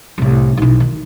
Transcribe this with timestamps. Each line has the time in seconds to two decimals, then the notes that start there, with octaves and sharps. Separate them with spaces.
0.18 C2 A2
0.57 B1 E4
0.80 D#3